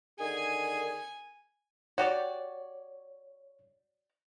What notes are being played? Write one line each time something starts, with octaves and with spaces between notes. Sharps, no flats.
D3 D#3 G#4 G#5
F#4 G4 C#5 D5